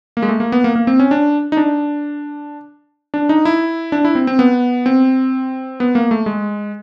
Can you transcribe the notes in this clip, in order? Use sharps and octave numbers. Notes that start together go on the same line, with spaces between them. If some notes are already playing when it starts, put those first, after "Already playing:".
A#3
G#3
A3
A#3
B3
A#3
A#3
C4
C#4
D4
D#4
D4
D4
D#4
E4
D4
E4
C4
C4
B3
C4
B3
A#3
A3
G#3